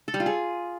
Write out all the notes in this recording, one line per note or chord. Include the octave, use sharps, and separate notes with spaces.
A4
G3
F4
G#4